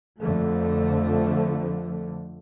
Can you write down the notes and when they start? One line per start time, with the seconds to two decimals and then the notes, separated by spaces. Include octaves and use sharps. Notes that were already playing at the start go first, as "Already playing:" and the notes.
0.19 F2 D3 F3 A3